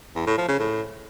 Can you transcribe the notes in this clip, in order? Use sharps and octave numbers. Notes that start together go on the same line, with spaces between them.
E2
A2
F3
C#3
A2